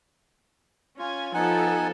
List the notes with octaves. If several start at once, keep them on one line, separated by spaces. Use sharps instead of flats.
C#4 F4 G#5
F3 B3 D#4 A4 F#5 G#5